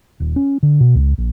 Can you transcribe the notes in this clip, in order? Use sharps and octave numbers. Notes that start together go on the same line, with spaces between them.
D#1
C#4
D3
B2
C#2
A#1